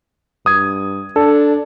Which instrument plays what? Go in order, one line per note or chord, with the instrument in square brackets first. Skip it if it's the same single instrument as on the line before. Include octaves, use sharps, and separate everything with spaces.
[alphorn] G2 [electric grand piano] D#6 G#6
[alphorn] D4 [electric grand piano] A4